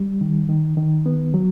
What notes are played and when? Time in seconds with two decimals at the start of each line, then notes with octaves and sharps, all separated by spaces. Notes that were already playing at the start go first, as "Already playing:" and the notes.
Already playing: G3
0.21 D#3
0.49 D#3
0.77 D#3
1.06 B3
1.34 F#3